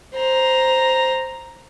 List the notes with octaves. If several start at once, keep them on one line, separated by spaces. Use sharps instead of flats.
C5 A#5